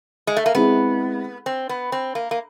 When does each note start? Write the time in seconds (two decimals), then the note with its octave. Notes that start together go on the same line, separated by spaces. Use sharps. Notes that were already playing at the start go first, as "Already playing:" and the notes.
0.27 G#3
0.37 A3
0.46 A#3
0.55 G#3 B3 C4 E4 G#4
1.46 C4
1.69 B3
1.92 C4
2.15 A#3
2.31 A#3